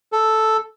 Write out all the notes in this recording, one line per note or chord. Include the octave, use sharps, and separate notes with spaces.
A4